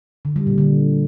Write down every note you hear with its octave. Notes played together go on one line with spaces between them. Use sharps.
D3
G3
A#2
D3